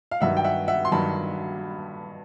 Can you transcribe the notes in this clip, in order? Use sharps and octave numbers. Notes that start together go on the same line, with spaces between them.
F5
G2 D#3 F#3 E5 F#5
G5
E5 F#5
E5 F#5
C6
G2 D#3 F#3 A5 B5